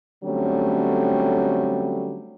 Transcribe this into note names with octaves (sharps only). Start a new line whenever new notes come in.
D3 F#3 G3 A3 C4 C#4